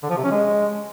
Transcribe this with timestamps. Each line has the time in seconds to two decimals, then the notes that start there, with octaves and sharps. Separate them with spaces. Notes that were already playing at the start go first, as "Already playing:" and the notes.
0.03 D3
0.10 F3
0.17 C3
0.24 C#4
0.31 G#3